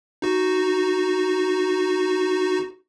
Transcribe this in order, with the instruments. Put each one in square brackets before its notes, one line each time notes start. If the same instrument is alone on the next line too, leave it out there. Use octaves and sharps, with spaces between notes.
[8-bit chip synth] D#4 F#4